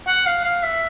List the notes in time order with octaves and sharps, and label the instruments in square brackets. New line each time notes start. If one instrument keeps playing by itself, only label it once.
[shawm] F#5
F5
F5
E5